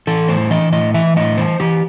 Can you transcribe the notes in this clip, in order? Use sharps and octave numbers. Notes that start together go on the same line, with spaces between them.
E3 A4
A2 C5
E3 D#5
A2 D#5
E3 E5
A2 D#5
E3 C5
E3 G4